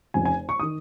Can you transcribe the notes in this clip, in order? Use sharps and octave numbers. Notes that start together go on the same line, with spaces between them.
F1 F2 C#3 G#5
G#5
C#6
D#3 D#6